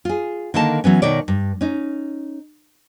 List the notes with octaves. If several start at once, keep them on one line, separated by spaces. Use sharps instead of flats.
F4 G#4
D3 D#3 A#3 A4 A5
E3 F#3 B3 C#4
B2 D#3 C#5 D5
G2
C#4 D#4